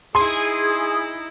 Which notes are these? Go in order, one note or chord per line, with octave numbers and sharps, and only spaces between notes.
D#4 E4 G#4 C6